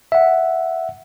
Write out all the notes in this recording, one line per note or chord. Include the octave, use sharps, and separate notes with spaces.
E5 F#5